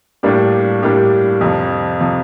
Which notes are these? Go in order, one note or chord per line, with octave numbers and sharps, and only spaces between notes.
A2 G3 A#3 D4 G4
A2 G3 A#3 D4 G4
F2 C3 F3
C3 F3